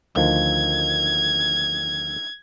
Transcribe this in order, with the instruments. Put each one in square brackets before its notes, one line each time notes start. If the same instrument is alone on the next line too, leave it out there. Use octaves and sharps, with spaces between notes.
[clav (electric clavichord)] D2 D#3 F3 [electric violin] G#6